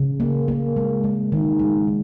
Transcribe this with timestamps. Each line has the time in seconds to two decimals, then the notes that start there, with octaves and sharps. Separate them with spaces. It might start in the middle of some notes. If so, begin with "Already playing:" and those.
Already playing: C#3
0.20 A#3
0.48 A#3
0.76 G#3
1.04 G#3
1.32 D#3
1.59 G#3
1.88 D#3